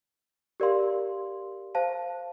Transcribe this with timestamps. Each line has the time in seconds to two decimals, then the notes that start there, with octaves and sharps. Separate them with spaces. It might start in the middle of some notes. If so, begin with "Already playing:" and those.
0.60 G4 A#4 D5 F5 C6
1.75 C5 F5 A5